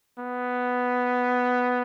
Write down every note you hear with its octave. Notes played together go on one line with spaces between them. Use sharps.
B3